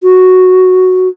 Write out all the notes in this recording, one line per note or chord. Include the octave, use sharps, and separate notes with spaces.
F#4